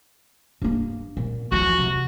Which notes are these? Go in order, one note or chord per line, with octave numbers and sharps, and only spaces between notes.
G2 A#3
A#2
E2 F3 F#4
C3